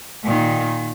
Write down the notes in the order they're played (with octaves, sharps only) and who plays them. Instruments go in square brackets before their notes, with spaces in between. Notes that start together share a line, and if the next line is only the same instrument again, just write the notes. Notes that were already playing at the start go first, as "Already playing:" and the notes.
[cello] A#2 D#3